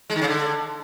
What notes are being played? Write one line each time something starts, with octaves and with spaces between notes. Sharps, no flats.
G#3
D#3
C#3
D3